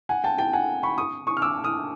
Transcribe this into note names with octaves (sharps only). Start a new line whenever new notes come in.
F#5 G#5
G5 A5
G5 A5
F#5 G#5
B5 C#6
C#6 D#6
C#6 D#6
F6
D6 E6
D#6 F6